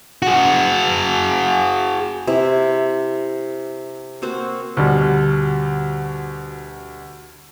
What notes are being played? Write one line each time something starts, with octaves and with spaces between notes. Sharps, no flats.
F#4 G#4
C3 E4
A#3 C4 F#4 C5
D2 B2 G3